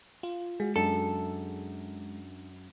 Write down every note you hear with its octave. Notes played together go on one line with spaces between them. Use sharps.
F4
G#3 F#4 G#4
F#2 D4 A4